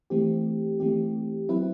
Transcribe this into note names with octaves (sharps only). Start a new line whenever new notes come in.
E3 A3 C4 G4
E3 A3 C4 G4
F#3 C4 E4 B4